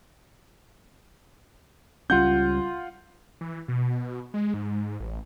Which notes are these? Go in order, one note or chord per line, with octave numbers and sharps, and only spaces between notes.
C#2 G3 C#4 F4 F#5 G6
E3
B2
G#3
G#2
A1